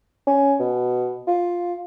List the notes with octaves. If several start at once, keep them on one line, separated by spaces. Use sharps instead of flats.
C#4
B2
F4